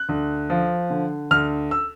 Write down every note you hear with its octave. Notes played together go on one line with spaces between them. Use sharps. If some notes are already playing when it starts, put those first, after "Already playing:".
Already playing: F#6
D2
F3
D3
D2 F6
E6